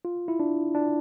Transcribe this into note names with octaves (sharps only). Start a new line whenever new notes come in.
F4
E4
D4
D4